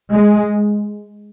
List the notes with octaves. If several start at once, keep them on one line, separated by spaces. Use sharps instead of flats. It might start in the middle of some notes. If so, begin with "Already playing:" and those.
G#3